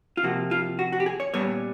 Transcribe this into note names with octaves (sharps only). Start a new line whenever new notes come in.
F4
C3 F3 A#3 F#4
F4
F#4
F#4
G4
G#4
C#5
A#2 G3 B3 C#5